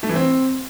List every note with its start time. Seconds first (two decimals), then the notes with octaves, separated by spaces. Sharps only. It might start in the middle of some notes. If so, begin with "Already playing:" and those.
0.03 A3
0.09 E3
0.16 C4